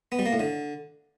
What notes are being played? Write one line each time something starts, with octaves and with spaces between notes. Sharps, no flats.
B3
G3
A#3
A2
D3